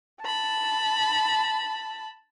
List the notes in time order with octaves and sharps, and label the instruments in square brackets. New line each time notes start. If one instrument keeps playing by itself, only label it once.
[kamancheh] A5 B5